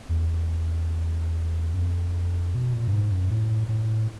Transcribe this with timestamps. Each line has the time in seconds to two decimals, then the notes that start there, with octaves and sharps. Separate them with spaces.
0.09 E2
1.74 F#2
1.79 F2
2.55 B2
2.73 A#2
2.88 G2
2.93 G#2
3.12 F#2
3.30 A2
3.68 A2